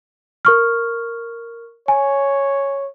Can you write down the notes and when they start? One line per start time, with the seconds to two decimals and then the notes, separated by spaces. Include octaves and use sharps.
0.45 A#4 C#6 F6
1.88 C#5 G#5